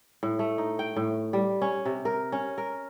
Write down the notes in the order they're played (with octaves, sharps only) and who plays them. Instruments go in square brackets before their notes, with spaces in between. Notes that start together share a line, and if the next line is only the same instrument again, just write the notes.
[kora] A2
A3
D#4
G5
A2
G3
C#4
C3
A#4
C#4
A#4